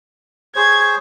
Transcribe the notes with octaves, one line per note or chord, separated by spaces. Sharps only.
G#4 C5 C#5 G#6